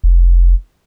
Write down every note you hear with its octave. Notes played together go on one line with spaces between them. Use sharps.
F1